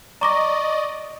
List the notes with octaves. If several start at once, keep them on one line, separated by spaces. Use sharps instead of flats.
D5 D#5 A#5 C#6 D6 A#6